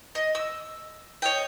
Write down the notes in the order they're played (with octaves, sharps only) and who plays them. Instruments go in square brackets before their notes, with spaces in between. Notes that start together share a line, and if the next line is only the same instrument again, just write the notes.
[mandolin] D#5
E6
C#5 D#5 G5